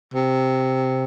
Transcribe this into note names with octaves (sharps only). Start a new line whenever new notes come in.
C3